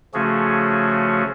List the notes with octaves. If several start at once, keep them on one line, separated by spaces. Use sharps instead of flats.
C#3 F3 A3 C#4 F#4 G#4